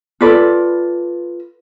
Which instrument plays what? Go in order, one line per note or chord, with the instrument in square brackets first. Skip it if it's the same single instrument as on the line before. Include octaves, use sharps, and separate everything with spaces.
[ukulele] F4 A4 B4 D5